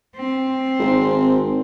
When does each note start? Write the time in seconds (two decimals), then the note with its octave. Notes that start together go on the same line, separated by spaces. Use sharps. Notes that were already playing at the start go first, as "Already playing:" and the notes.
0.16 C4
0.79 G#1